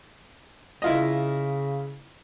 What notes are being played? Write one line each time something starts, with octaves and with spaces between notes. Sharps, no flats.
C#3 E4 F4 D#5